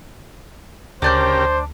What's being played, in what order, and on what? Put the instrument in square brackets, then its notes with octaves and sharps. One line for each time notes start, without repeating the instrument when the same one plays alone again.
[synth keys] D2 [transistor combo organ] C#3 G4 A#4 [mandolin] D4 D5 G6 [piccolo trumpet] C5